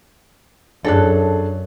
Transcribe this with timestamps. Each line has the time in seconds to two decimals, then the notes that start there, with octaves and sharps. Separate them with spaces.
0.85 F#2 D4 G#4 A4 F#6